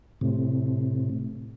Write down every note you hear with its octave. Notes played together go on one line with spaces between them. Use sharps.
A2 C3